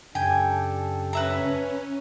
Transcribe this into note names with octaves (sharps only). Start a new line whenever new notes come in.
F#2 C#3 D4 G4 A4 G5 G#5
C#4 B4 E5 A#5